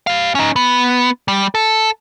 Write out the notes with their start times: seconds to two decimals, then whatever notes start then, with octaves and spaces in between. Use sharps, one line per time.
0.07 G4 F5
0.35 C#4 D#4
0.56 B3
1.28 G3
1.55 A4